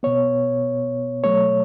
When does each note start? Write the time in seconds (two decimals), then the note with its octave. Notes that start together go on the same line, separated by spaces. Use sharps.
0.03 B2 B3 C#5
1.24 B2 F#3 A3 C#5